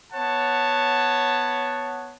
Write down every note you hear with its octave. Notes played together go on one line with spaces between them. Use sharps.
B3 C#5 F#5 A5